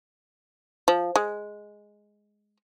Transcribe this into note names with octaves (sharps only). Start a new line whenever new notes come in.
F3
G#3